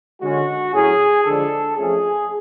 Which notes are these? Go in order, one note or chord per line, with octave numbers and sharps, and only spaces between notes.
D3 G#3 C#4 F#4
A2 F#3 C#4 G#4
D3 F3 G#3 D4 A4
F2 F3 A3 C#4 G#4